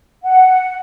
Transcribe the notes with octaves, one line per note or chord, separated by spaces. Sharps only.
F#5